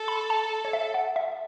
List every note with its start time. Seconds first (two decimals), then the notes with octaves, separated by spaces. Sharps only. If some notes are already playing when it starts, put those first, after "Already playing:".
Already playing: A4
0.08 B5
0.30 A5
0.65 C#5
0.73 E5
0.94 F#5
1.16 E5